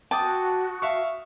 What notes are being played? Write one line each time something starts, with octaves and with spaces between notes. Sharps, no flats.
F#4 G5 A5 D6 D#6
E5 F5 C#6